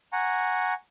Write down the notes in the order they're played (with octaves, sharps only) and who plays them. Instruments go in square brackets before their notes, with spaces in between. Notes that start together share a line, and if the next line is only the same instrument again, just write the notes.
[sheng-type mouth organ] F#5 G#5 A#5 C#6